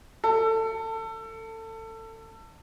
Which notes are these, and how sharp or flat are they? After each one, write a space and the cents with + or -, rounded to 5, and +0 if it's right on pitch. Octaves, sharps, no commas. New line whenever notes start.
A4 +25